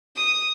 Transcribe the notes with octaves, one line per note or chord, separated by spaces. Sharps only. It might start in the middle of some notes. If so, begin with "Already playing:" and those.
D#6